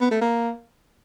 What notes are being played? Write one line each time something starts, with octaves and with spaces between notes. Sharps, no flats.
B3
A3
A#3